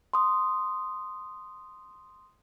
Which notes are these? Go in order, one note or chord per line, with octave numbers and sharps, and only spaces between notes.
C6 D#6